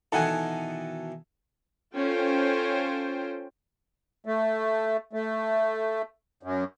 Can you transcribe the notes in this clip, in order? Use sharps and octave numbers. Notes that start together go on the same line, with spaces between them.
B2 D#3 E3 A4 F#5 G#5
C#4 F4 A4 C5 G5
A3
A3
F#2